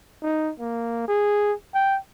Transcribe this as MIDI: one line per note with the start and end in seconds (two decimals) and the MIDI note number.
0.22 0.52 63
0.60 1.05 58
1.08 1.53 68
1.74 1.97 79